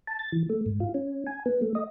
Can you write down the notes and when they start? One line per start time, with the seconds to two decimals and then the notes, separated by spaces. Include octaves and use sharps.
0.07 A5
0.19 A6
0.32 E3
0.50 A3
0.66 G#2
0.80 F4
0.94 C#4
1.27 G#5
1.46 B3
1.62 A3
1.75 D#5